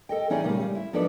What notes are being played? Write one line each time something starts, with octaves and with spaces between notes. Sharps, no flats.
A4 D#5 G5
E3 C#4 D#4 G#4 C#5 D5
A#2 C#3 G3 A3 A#3
E4
F3 D4 D#4 A4 B4 D5